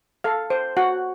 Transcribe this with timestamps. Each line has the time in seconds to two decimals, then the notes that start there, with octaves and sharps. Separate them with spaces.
0.24 A4 F5
0.50 C5
0.77 F#4 F#5